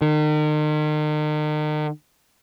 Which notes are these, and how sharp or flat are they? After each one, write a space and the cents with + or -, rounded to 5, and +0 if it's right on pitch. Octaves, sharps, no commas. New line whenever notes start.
D#3 -40